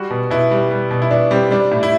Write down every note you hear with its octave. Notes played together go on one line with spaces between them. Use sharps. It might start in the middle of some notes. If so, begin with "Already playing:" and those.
Already playing: G3 F#4
B2
B2 E4
G3
G3
B2
E4
B2 D4
G3 C4
G3 D4
A2
E4